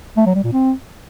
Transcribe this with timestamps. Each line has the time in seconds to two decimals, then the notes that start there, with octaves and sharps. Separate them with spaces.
0.17 A3
0.26 F#3
0.35 G3
0.44 A#2
0.53 C4